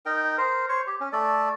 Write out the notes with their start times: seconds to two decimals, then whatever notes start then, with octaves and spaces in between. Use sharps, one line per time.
0.06 D#4 A#4 G5
0.38 A#4 C5
0.69 C5 C#5 C#6
0.87 G4
1.01 C#4
1.13 A3 A4 D5